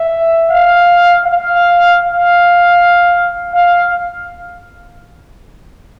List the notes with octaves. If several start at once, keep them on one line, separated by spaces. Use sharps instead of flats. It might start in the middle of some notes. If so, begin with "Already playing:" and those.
Already playing: E5
F5
F5
F5
F5